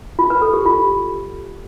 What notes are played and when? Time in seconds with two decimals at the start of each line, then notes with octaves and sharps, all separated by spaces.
0.19 F4
0.30 B4
0.42 A4
0.54 G4
0.66 F4